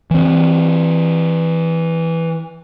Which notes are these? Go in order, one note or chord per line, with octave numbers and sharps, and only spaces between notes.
E3 C4